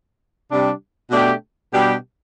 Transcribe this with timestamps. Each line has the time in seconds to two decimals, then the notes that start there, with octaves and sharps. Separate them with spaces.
0.50 C3 G3 D4
1.11 B2 A3 D4 G4
1.73 B2 G3 D4 G4